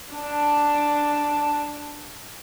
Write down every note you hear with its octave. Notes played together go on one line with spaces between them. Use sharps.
D4 A5